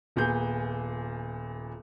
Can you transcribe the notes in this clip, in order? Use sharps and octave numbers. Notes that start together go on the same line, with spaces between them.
D#1 A#2 B3 G#4 G6